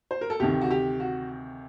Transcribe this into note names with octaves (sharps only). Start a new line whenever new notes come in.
C5
A#4
A4
D2 C3 D#3 G4
F#4
G4
F#4